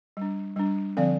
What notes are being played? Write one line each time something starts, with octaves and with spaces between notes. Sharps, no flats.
G3 D4
G3 D4
D3 F3 C4 D5 F5